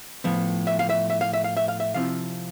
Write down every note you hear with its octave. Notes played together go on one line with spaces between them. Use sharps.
A2 F3 B3
E5
F5
E5
E5
F5
E5
F5
E5
F5
E5
C3 F3 C4 E4 F5